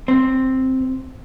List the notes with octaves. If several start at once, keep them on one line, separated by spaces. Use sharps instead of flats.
C4